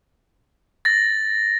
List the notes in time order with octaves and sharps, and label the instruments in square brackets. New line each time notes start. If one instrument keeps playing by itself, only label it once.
[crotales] A6 A#6